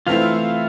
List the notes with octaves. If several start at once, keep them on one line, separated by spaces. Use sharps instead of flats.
E3 A3 C4 E4 F4 F5